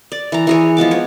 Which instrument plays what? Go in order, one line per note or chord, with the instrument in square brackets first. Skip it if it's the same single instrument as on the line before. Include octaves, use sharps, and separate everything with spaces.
[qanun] D5
E3 A#5
E3 G#4 C#5
F3 G#3 B3 D6
C#5 F#5